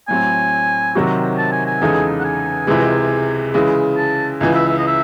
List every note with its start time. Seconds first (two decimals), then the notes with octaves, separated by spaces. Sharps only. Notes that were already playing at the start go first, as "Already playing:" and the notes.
0.08 A2 F#3 C4 G#5
0.95 C3 D#3 F#3 C4 F#4
1.38 A5
1.52 G#5
1.66 G#5
1.82 E2 C#3 G#3 D#4 A4
2.20 F#5
2.25 G#5
2.67 C#2 C3 E3 G#3
3.54 C#3 E3 G#3
3.97 A5
4.40 C#2 C#3 E3 G#5
4.55 E5
4.69 E5
4.78 D#5
4.87 E5